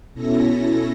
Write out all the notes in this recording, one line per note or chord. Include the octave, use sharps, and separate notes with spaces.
B2 C#4 E4 A4 A#6